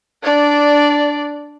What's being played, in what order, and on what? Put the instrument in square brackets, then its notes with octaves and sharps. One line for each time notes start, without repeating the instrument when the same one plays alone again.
[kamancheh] D4 D5